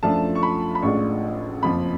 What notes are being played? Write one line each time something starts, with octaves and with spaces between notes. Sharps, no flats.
F#2 F3 A3 D4 F4 A5
C#6
B5
B5
A1 A2 G#3 D4 F4 C#6
F#1 F2 F3 B5